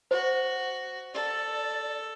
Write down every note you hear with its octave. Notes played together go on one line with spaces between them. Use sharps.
F#4 C5
A4 D5